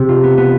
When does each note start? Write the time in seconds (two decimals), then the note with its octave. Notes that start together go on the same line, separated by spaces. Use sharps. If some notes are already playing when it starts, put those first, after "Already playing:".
Already playing: C3 C4
0.09 F4
0.23 B3
0.37 B3